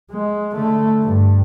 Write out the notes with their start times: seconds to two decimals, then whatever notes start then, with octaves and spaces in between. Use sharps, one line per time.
0.11 G#3
0.53 D3 A3
1.03 G2